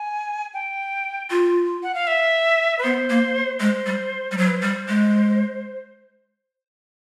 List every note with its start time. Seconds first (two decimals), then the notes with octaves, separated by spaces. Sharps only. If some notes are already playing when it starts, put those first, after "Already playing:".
Already playing: G#5
0.54 G5
1.30 F4
1.83 F#5
1.95 F5
2.07 E5
2.79 B4
2.83 B3 C5
3.10 A#3
3.60 G#3 C5
3.86 G3
4.32 G3
4.37 F#3 C5
4.47 B4
4.56 C5
4.62 G3
4.88 G#3